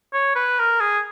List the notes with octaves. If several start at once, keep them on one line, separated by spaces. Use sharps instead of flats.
C#5
B4
A#4
G#4